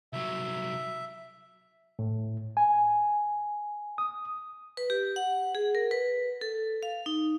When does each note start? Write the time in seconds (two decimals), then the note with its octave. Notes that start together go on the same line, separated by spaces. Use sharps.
0.13 C2 F#3 E5
1.99 A2
2.57 G#5
3.98 D#6
4.77 B4
4.90 G4
5.16 F#5
5.55 G#4
5.75 A#4
5.91 B4
6.41 A4
6.83 F5
7.06 D#4